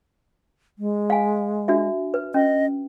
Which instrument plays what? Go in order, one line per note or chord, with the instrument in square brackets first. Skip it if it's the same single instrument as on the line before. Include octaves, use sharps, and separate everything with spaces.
[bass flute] G#3
[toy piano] F5 G#5
D4 F#4 E5
B4
[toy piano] C#4 [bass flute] D#5